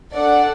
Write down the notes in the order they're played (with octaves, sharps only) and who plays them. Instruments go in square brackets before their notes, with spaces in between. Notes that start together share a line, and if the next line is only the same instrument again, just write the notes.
[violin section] D4 A4 D5 F#5